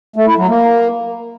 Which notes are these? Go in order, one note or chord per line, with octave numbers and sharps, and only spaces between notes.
A3
E4
F#3
A#3